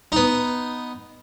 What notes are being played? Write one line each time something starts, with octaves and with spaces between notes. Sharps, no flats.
B3 D#4